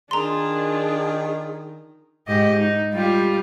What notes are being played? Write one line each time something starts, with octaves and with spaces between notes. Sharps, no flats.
D#3 D4 F4 G#4 A#5 C6
G#2 G4 D#5
D#4
G3 F4 G4